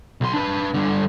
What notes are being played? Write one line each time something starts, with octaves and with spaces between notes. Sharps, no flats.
B1 C6
D4 B4
G2 D3